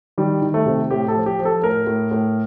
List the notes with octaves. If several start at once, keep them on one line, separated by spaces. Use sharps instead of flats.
D#3 G3
D#3
A3
C3
A2 G4
A4
F3
G4
F3
A4
A2 A#4
A2
A2